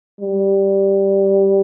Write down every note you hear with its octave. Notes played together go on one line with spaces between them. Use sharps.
G3